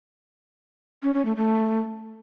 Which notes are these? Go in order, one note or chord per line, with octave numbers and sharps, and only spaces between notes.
C#4
C#4
A3
A3